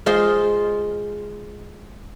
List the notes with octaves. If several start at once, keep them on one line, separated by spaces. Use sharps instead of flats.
G#3 F4 C5 D#5